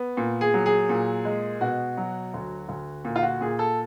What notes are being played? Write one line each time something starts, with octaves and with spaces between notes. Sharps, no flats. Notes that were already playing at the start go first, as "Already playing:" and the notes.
Already playing: B3
A#2
G#4
F#3
G#4
A#2
G#3
B2 F#4
F#3
D2
D2
A#2
F4
F#4
A#2 G#4
A4